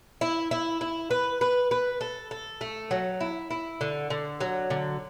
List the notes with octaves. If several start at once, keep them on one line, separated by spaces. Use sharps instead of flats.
E4
E4
E4
B4
B4
B4
A4
A4
A3
F#3
E4
E4
D3
D3
F#3
D3